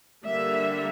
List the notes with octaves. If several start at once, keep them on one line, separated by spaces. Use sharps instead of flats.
D3 G3 A#3 E5